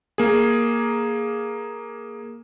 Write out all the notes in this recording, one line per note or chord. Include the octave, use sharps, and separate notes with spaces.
A#3 G#4